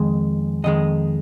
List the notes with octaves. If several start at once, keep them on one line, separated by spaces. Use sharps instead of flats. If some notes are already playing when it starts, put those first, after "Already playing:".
Already playing: F2 D#3 G#3
F2 D#3 G#3 D#5